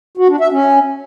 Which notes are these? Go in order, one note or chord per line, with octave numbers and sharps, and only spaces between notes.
F#4
D4
E5
C#4